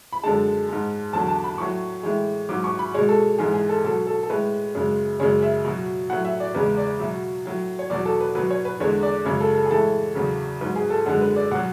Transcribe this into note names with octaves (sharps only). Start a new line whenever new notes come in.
B5
F#2 D3 G#3 A5
G#2 G#3
E2 D3 F#3 A5
A5
B5
A2 F#3 C#6
A2 E3 G#3
G#2 F#3 D6
C#6
B5
B2 G#3 C#5
A4
G#2 E3 G#3 G#4
G#4
A4
B2 F#3 A4
A4
A4
A2 G#3 B4
F#2 C#3 G#3
F#2 C#3 G#3 C#5
E5
B2 F#3
A2 F#3 F#5
E5
D5
E2 C#3 G#3 B4
D5
B2 F#3 E5
A2 F#3
C#5
E2 B2 F#3 D5
A4
B4
B2 F#3 B4
C#5
B4
E2 D3 G#3 C#5
D5
F#2 C#3 G#3 C#5
A4
A4
G#4
A2 E3 G#3 A4
E2 C#3 F#3
G#2 F#3 B4
G#4
A4
F#2 D3 G#3 F#5
B4
D5
B2 F#3 F#5